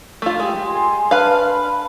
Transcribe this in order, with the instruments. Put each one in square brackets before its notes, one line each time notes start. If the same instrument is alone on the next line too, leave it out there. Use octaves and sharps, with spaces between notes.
[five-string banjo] A3 F4
[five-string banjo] G#3 [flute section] G4
[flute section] G#5 C6
[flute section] D4 A5 F6 [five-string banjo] B4 F5
[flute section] B5